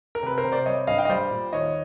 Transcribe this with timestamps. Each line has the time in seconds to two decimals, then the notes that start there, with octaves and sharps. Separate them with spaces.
0.15 A#4
0.23 C3 B4
0.37 A#4 C5
0.45 C3
0.52 C5 D5
0.66 G3 C#5 D#5
0.87 G2 D#5 F5
0.98 F5 G5
1.05 D#5
1.10 G3 C5 D5
1.31 A#2
1.53 D#2 C#5 D#5